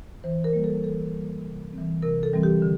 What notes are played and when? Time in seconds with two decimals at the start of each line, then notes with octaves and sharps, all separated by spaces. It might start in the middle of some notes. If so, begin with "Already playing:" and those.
0.24 E3 C5
0.44 A#4
0.53 G3 A#3
0.64 A4
0.84 E3 A4
1.14 G3 A#3
1.43 C3
1.73 E3 G3 C4
2.02 C3 A#4
2.23 A4
2.33 E3 G3 C4
2.43 G4
2.62 D3